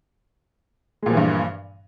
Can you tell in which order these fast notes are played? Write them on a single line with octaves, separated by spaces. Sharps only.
G#3 A#2 F3 E3 G2